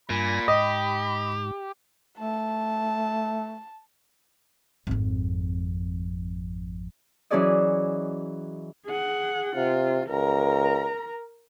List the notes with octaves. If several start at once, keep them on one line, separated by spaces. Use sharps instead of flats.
G2 A#2 G#5 B5 A#6
G#2 G4 D#5
A3 A5
G#1 F2
E3 F#3 C#4 G#4 D5 D#5
G#4 F#5
C3 F4
C#2 A#4 A#5